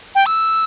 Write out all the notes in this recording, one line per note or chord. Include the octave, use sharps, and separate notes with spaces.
G5
E6